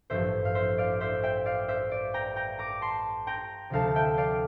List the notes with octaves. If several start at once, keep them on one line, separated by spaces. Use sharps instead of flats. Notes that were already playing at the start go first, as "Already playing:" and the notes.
A1 G2 F3 C5 E5
F5
C5 E5
D5 F5
C5 E5
E5 G5
D5 F5
C5 E5
D5
G5 A#5
G5 A#5
A#5 D6
A5 C6
G5 A#5
D2 C3 F3 F5 A5
A5
E5 G5
D5 F5